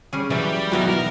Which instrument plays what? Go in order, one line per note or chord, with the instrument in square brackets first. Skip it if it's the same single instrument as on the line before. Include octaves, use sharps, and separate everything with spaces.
[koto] G3 C#4 G#4
[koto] E3 F#3 [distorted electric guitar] G3 G4
[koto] B2 B3 A#5 [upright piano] D#3 F#3 [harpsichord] E3
[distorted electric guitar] A#4